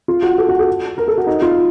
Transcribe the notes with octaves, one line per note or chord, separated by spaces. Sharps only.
F4
F#4
A4
F#4
A4
A#4
A4
F#4
D#4
F4